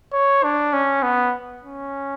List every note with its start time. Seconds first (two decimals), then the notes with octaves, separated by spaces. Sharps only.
0.13 C#5
0.43 D4
0.73 C#4
1.03 B3
1.64 C#4